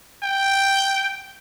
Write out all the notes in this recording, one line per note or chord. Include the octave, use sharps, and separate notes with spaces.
G5